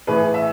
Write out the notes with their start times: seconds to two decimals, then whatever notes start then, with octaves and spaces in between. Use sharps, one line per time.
0.07 A2 E3 G#4 B4
0.34 E5